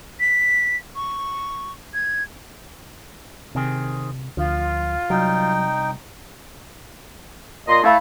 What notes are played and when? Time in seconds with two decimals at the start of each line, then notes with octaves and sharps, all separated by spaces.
0.20 B6
0.96 C#6
1.94 G#6
3.55 C3 D#3 C4 G#4
4.37 D2 F3 F4
5.10 C2 F#3 D#4 G5
7.68 A#2 D#5 C6
7.84 A3 E4 F5 B5